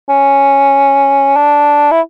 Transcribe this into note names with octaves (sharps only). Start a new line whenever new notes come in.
C#4
D4
E4